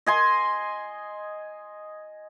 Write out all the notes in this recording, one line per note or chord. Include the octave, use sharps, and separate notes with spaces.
D#5 G#5 C6